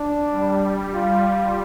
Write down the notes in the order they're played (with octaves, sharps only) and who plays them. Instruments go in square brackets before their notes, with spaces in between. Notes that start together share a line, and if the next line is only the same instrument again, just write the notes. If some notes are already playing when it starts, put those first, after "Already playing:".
Already playing: [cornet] D4
[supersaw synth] G3
[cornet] F4